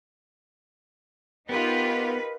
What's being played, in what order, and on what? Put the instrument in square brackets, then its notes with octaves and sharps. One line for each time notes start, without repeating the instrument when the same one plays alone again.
[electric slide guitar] B3 [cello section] D#4 B4 [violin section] F4 G4 [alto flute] A#4